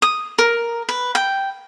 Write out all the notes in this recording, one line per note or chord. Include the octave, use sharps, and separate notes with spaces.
D#6
A#4
B4
G5